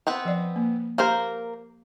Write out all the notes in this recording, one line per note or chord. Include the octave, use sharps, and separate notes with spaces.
B3 C4 B4
F3 D5
A#3
A#3 G4 A#4 C5